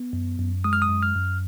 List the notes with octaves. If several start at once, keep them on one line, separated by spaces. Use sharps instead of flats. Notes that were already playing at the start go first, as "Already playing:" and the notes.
Already playing: B3
F#2
F#2
G#3 D#6
F6
D#6
F#2
F6
F#2